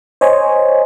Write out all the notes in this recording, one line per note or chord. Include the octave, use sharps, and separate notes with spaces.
C5 C#5 D#5 G#5